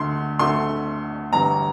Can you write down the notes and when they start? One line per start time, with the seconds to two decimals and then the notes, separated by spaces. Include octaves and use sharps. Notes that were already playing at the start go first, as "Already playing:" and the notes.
Already playing: D2 D3 A3 C6
0.39 D2 D3 A3 C6
1.32 G1 G2 E3 A#5